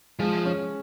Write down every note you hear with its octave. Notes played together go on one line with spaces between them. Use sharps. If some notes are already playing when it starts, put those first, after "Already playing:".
F3 G#3
C#4